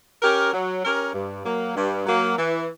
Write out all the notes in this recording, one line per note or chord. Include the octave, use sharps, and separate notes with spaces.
C#4 G4 A#4
F#3
C#4 G4 A#4
G2
F#3 A#3
G2
F#3 A#3
E3